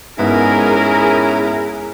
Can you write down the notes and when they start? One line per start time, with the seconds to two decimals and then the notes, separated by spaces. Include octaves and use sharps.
0.19 G#2 B3 C#4 E4 G#4 A#4